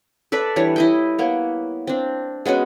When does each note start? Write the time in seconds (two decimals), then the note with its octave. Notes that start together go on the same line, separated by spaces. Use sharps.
0.32 A4 B4 D5 E5
0.56 E3 G3 D4 C#5
0.76 E4 D#5 G5
1.18 A#3 B3 C#5
1.87 C4 D4
2.46 G#3 B3 C#4 F#4